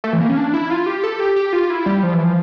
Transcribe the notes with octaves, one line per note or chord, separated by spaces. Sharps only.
A3
E3
A#3
C#4
D4
E4
F4
G4
A4
G4
G4
F4
E4
G3
F3
E3
F3